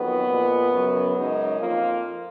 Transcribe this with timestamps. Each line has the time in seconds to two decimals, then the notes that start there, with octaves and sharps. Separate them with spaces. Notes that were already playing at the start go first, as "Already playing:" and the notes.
Already playing: F2 D#3 F#3 B3
0.27 A#2 F3 G#3
0.71 F#2 C#3 F#3
1.14 F#2 C#3 G#3 D#4
1.59 F2 F3 A#3 F4